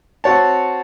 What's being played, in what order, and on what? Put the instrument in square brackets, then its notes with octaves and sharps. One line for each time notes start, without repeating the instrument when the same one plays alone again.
[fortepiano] C4 F#4 C#5 A5